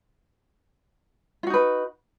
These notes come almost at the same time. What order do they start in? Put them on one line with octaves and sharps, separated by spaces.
F4 F#4 D#4 B4